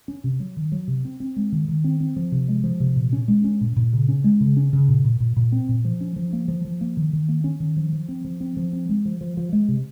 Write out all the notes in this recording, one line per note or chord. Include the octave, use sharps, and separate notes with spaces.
C#4
C3
F#3
D#3
F#3
C3
C4
C4
G#3
D#3
D#3
C4
C4
F3
C3
G#3
F3
C3
A#2
C#4
G#3
C#4
A#2
A#2
C#3
C#4
G#3
C#3
C#4
C#3
A#2
A#2
A#2
A#2
C4
A#2
F3
C#4
F3
A#3
F3
F3
A#3
D#3
D#3
A#3
C#4
D#3
F3
F3
C4
F3
C4
F3
C4
G#3
F3
F3
F3
G#3
C3